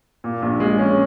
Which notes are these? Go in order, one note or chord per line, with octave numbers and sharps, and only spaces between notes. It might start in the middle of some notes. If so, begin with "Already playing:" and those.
A#2
A#1
G#3
C#4